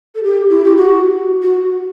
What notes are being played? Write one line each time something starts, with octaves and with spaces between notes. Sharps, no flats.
A4
G4
E4
G4
F#4
F#4